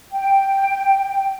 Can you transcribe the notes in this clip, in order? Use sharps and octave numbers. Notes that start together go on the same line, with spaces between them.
G5